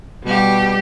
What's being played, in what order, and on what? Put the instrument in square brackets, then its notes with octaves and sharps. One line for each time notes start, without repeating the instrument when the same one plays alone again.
[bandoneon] B2 [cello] G3 G4